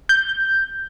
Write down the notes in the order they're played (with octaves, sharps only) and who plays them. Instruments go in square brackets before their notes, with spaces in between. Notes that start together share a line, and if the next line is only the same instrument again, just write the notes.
[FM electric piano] G6